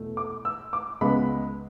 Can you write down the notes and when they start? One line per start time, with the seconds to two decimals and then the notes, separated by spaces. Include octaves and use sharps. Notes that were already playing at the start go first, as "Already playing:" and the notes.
Already playing: E2 B2 A3
0.17 D6
0.45 E6
0.73 D6
1.01 C#2 C#3 G#3 B3 B5